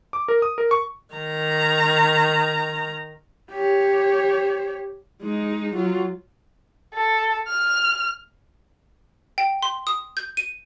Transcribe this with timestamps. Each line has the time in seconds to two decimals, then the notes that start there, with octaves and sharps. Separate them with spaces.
0.13 D6
0.28 A#4
0.42 D#6
0.58 A#4
0.71 C#6
1.15 D#3 A#5
3.51 G4 C#5
5.22 G#3 D#4
5.75 F#3 F4
6.94 A4
7.48 F6
9.38 G5
9.63 C6
9.87 D#6
10.17 G6
10.37 D#7